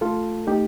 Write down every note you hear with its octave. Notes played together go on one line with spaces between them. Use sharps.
A3 F4 A4
A3 D#4 G4